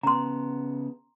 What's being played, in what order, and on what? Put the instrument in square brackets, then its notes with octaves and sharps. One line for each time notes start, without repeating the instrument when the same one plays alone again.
[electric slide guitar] C#3 B3 [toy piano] A#5 C6